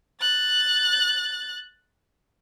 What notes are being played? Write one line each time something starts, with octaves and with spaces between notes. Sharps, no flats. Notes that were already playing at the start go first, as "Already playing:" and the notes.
F#6 A6